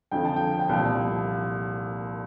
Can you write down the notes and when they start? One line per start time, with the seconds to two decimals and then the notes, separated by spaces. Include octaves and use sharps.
0.11 F2 D3 F3 G5
0.25 A5
0.36 G5
0.59 G5
0.69 C2 A#2 F3 A5